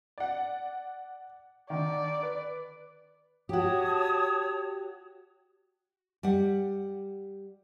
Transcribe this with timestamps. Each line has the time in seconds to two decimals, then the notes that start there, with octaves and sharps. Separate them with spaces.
0.18 D5 F#5
1.70 D3 D#3 D5
2.23 B4
3.49 F#4 G4 C#5 A5 D#6
6.23 G3 F#5